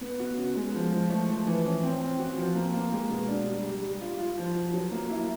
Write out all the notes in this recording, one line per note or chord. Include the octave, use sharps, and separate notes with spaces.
B3
F#4
C#3
G#3
F3
F3
A3
F3
E3
C#4
C4
C4
F#4
F3
A#3
A#3
G#3
B2
D4
G3
G3
G3
F4
F4
F3
F#4
F#3
A#3
E4